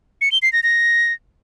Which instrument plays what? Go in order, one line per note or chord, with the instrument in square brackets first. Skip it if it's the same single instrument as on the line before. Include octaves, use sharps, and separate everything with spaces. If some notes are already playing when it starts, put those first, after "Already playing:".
[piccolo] C#7
G7
C7
A#6
A#6